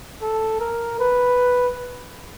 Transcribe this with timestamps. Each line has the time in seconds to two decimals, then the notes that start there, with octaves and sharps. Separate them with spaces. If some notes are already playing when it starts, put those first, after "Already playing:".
0.22 A4
0.60 A#4
1.00 B4